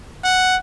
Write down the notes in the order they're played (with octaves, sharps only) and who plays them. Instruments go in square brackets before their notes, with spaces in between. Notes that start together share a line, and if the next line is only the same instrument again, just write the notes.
[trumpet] F#5